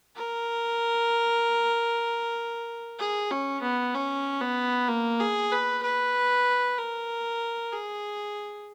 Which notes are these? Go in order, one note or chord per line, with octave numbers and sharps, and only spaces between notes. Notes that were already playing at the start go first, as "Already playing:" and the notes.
A#4
G#4
C#4
B3
C#4
B3
A#3
G#4
B4
B4
A#4
G#4